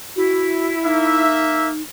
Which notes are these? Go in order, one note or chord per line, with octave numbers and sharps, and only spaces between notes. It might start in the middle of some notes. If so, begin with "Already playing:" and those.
E4 F#4
A#3 D#4 E5